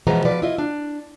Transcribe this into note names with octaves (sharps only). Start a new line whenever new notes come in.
B2 E3 F3 G#3 B3 A#5
B2 F3 B4 D5
E4 F4 D#5
D4